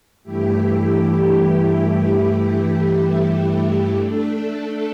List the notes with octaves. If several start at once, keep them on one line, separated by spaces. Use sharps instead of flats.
G2 E3 A3 E4 G4
A3 D4 A4